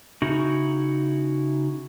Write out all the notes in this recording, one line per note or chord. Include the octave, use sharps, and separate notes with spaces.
C#3 D#4 E4 F#4